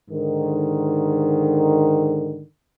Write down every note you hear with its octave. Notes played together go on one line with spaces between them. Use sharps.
G#2 D3 D#3